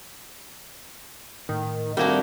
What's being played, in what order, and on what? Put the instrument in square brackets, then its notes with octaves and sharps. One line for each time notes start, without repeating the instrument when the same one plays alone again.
[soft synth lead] A2 [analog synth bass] D#3
[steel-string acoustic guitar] D#3 F#4 [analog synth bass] G3 [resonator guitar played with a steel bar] A3 A#3 D4 [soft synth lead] C4